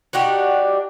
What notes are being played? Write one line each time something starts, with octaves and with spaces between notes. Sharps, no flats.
D4 D#4 F#4 G4